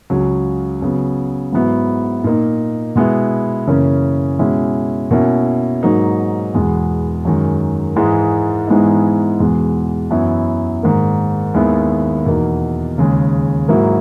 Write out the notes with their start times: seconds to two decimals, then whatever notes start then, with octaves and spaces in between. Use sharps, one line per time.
0.10 C#2 C#3 F#3
0.82 C#3 F#3 B3
1.52 G#2 F#3 B3 E4
2.24 A#2 A#3 D#4
2.95 B2 G#3 B3 E4
3.67 F#2 C#3 E3 A#3 C#4
4.39 B2 G#3 C#4 E4
5.11 B2 A#3 C#4 E4
5.83 G#2 F#3 A#3 D#4
6.54 E2 B2 G#3 B3
7.25 F#2 D#3 G#3
7.96 G#2 E3 G#3
8.68 G#2 E3 G#3 B3 D#4
9.40 E2 B2 G#3
10.11 F#2 E3 B3 E4
10.83 G#2 D#3 A#3
11.54 D#2 D#3 G#3 B3 E4
12.26 E2 B2 A#3 D#4
12.98 D#2 C#3 G#3
13.68 G#2 F#3 A#3 E4